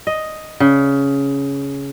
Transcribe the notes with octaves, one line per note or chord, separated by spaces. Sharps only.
D#5
C#3